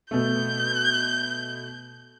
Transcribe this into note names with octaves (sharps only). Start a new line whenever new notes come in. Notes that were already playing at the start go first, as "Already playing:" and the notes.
B2 A3 G6